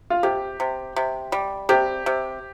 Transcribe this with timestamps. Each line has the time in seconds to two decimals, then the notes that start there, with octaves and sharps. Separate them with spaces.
0.10 F4
0.23 C3 G4
0.60 C3
0.96 C3
1.32 G3
1.69 C3 G4
2.06 C3